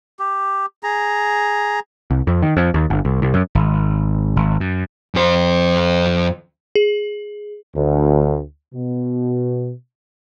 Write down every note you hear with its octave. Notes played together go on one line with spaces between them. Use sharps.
G4
G#4 A#5
C2
F2
D#3
F2
D#2
G1
C2
C2
F#2
G#1
G#1
F#2
F2 C5
G#4
D2
B2